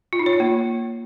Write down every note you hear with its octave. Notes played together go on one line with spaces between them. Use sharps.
F4
D#4
C#5
F4
A#3